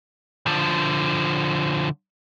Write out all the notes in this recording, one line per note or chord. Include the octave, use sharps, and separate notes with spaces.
D3 F3